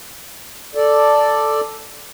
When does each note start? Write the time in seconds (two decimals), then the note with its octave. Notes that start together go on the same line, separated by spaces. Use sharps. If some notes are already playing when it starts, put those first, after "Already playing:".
0.75 A4 D5